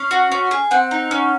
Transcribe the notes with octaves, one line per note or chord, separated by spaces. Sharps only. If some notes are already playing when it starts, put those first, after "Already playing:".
Already playing: C#4 F5
F#4
C#4
G#4
C4 F#5
D#4
C#4